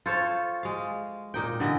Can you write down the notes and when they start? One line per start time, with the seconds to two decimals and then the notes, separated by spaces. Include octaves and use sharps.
0.06 F4 A4 C5 C#5
0.63 G#3 F5
1.34 A#2 D#4 G5
1.60 D3 E3 D#5